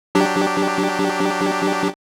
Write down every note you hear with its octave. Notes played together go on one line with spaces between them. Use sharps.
F#3 D4 G4